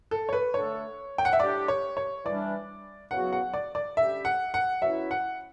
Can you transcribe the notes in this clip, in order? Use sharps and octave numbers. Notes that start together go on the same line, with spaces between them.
A4
C#5
B4
D3 A3 D4 A4 C#5
G5
F#5
E5
A2 G3 D4 G4 D5
C#5
C#5
E3 G3 D4 D5
E2 C#3 F#3 B3 F#4 F#5
F#5
D5
D5
D3 G3 C#4 G4 E5
F#5
F#5
B2 F#3 C#4 E4 E5
F#5